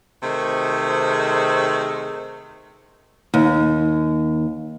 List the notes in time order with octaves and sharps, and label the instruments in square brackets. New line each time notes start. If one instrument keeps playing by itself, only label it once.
[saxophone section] C3 D#3 A3 G#4 C5
[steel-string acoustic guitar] D#2